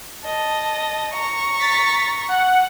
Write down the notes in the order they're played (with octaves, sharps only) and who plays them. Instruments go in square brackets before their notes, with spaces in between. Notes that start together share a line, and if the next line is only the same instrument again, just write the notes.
[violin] D#5 A5
A#5 C#6
[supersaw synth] A6 B6
F#5